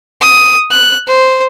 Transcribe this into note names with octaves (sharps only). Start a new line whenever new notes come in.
D#6
F#6
C5